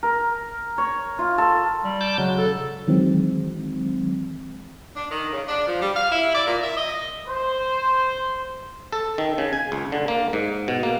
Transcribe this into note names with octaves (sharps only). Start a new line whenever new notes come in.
A#4
C#5
F4
A4
G3
A5 D6 G6
C#3 F#3 G#3
A4
D#3 E3 F#3 G#3 C4
D4
D#3
C#3
D4
F3
G3
F5
E4
D5
A#2
E5
D#5
C5
A4
D#3
C#3
G#5
C#2
D3
A#3
G#2
B2
A#3